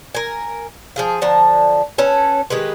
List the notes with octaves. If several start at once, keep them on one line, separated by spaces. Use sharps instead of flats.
A#4 G#5
F3 G#4 F5
D3 F3 A5 A#5
C#4 A4 B4
D#3 G#3 G4 B4